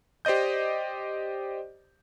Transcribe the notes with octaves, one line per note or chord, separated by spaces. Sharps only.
G4 C5 D5 D#5 G6